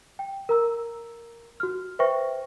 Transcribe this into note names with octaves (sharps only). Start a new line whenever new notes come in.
G5
A#4 A#5 E6
F#4 F6
B4 C5 E5 G5 C#6 A#6